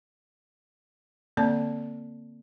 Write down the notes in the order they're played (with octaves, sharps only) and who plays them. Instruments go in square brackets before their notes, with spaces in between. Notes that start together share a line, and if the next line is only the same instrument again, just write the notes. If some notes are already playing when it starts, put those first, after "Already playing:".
[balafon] D3 A#3 C4 D5 A5